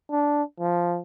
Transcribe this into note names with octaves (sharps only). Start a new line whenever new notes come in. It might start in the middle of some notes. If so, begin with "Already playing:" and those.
D4
F3